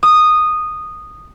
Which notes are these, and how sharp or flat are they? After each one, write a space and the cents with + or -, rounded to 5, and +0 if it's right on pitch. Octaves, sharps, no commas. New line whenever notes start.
D#6 -10